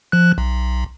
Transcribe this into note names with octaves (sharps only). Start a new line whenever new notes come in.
F3 F#6
B1